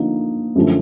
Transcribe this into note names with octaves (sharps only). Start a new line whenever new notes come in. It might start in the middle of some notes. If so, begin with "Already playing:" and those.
Already playing: D3 F3 A#3 D#4
F#2 D3 F3 A3